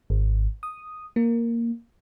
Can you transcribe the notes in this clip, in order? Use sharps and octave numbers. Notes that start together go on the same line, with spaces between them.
G#1
D#6
A#3